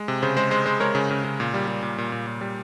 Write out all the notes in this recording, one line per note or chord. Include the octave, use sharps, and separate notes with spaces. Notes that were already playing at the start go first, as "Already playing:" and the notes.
Already playing: G#3
C3
C#3 C5
G#3 C5
G#3 C5
G#3 C5
G#3 A#4 C#5
C#3
C#3
C#3
A#2
G3
G3
A#2
A#2
A#2
A#2
G3